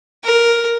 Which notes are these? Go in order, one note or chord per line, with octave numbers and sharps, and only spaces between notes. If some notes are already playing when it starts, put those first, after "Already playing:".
A#4